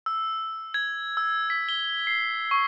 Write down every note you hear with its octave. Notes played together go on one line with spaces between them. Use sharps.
E6
G#6
E6
B6
G7
C7
C#6